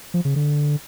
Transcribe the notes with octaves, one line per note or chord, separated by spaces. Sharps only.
F3
C#3
D3